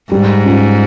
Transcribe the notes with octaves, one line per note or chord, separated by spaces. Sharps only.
G#2 G3
C#4 F4